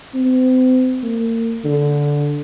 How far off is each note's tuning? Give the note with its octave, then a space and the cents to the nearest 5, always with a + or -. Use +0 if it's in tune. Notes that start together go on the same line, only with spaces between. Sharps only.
C4 -35
A#3 -35
D3 -10